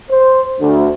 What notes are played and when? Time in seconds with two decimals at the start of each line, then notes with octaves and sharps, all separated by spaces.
0.11 C5
0.60 D2